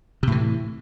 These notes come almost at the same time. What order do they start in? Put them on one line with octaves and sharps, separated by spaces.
C3 A2 E3